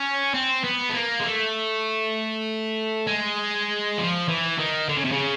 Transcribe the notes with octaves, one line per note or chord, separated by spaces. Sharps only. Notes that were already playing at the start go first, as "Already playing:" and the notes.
Already playing: C#4
C4
B3
A3
A#3
G#3
A3
G#3
F3
E3
D#3
D3
C#3
C3
C#3